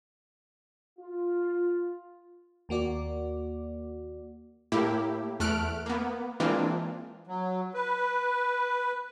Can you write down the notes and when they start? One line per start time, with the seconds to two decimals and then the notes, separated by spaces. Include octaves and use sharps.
0.99 F4
2.69 D#2 A#3 F#4 D5
4.72 A2 A#3 E4 G4
5.40 E2 A3 F6 F#6 D7
5.86 A#3 B3
6.40 E3 G#3 A#3 C4 D4 F4
7.27 F#3
7.74 B4